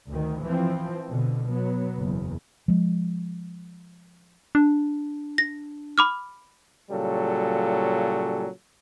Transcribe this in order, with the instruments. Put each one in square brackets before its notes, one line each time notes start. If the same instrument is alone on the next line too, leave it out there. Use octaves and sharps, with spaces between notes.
[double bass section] D2 D#3
E3 F3 C4
B2 D3
F#3 B3
F#1 E2
[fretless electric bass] F3 G#3
[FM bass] D4
[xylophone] A#6
B5 D6 F6
[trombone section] A#2 C#3 F#3 G3 A4